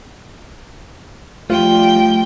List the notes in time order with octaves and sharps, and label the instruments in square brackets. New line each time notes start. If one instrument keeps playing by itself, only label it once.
[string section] F3 G3 [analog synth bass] A3 [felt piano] F4 [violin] G5